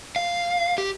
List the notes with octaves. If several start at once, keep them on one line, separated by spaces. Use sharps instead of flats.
F5
G4